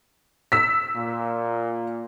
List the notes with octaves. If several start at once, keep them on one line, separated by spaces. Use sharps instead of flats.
E6 B6
A#2